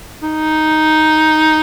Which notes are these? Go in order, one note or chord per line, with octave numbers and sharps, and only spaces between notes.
D#4